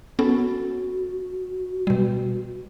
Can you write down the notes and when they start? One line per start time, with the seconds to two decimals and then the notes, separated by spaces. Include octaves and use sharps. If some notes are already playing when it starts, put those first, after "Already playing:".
0.19 B3 C#4 F#4 A4
1.87 B2 G3